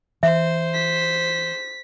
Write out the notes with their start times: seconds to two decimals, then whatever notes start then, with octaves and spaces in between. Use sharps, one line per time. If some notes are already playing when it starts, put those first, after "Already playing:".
0.23 E3 C5 E5
0.74 B6